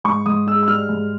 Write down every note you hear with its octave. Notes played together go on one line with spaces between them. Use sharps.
G#2 C#6
G#2 D#6
G#3 E6
E6
G3 F6
G#2